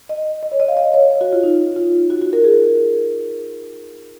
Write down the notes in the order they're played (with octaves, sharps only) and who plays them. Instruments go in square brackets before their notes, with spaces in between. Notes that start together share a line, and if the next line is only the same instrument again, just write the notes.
[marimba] D#5
D#5
C#5
D#5
F5
D#5
C#5
C#5
F#4
F4
D#4
F4
F#4
F#4
A#4
G#4